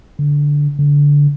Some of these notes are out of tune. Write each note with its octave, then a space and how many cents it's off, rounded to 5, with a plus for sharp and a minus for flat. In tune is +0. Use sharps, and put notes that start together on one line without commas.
D3 -10
D3 -20